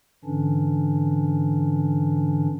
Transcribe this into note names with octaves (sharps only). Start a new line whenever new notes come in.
G#2 D3 E3 C#4 D4